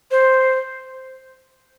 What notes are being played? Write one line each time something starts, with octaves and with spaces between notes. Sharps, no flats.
C5